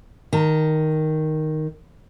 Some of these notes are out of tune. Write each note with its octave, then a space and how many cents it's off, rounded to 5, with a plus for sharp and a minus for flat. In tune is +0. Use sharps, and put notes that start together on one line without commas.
D#3 +0 A5 +35